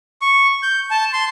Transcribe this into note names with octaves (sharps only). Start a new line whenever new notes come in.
C#6
G6
A5
C6